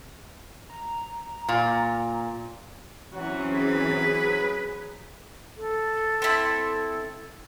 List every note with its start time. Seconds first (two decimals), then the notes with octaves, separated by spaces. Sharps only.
0.70 A#5
1.49 A#2
3.14 E3 F#3 C4 C#4 F#4
3.55 G#4 B4
5.57 A4
6.22 C4 E4